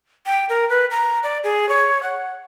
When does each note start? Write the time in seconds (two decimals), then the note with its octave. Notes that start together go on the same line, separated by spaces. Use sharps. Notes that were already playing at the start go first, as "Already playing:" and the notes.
0.26 G5
0.49 A#4
0.69 B4
0.91 A#5
1.23 D5
1.44 G#4
1.69 C#5
2.03 F#5